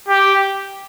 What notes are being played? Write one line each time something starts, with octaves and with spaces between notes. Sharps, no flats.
G4